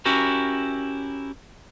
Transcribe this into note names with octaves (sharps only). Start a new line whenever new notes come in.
C#4 E4 F#4 G4 A#4